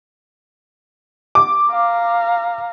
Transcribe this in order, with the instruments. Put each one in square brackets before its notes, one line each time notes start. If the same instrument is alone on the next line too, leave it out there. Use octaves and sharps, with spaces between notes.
[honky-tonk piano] D6
[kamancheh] F5 A#5